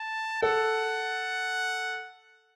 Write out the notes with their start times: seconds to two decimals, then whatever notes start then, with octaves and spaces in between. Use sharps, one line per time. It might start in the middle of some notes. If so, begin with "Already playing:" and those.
Already playing: A5
0.42 A4 F#5